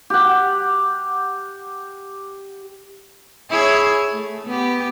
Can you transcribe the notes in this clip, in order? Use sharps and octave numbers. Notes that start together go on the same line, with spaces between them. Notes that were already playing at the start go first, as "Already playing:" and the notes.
G4 F#5
E4 G#4 C#5
A3
B3 G4